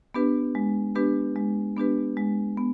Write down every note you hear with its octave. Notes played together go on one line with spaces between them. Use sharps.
B3 D4 G4 B4
G#3
B3 D4 G4 B4
G#3
B3 D4 G4 B4
G#3
B3